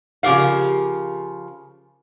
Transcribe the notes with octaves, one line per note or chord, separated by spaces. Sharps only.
C#3 F3 G4 A#4 F5